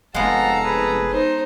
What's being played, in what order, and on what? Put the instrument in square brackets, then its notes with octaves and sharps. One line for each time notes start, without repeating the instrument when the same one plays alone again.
[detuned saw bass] F1 [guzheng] G#3 B3 [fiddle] A4 A#5 [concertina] F5 F#5
[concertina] G#4 B4
[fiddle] D#4 C5